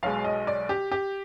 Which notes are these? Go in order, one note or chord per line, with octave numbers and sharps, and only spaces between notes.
B1 B2 G#3 F5
D#5
D5
G4
G4